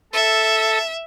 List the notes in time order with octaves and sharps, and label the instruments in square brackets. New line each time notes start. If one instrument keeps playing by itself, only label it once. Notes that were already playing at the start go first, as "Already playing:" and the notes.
[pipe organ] A4 [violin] E5